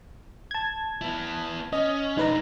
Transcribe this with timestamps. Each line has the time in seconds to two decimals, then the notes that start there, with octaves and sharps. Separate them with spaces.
0.51 A5 G#6
1.01 B3 E4
1.73 C#4 D#5
2.17 G#3 D4 D#4 B4 A#5